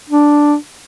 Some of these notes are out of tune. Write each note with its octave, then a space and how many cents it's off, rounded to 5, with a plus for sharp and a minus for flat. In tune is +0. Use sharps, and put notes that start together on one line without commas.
D4 +0